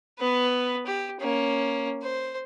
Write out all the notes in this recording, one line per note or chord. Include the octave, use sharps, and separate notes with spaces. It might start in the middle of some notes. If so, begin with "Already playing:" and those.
B3 B4
G4
A#3 C#4
C5